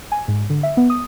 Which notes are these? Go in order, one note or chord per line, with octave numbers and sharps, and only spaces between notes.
G#5
G#2
D3
E5
B3
D#6